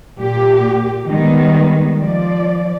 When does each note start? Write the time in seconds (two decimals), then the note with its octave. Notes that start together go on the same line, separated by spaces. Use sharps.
0.18 A#2 G4
1.09 D#3 G3 G#3 B3
1.98 F3 D5